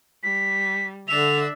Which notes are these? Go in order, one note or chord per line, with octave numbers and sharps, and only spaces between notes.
G3 B6
D3 D4 E5 F7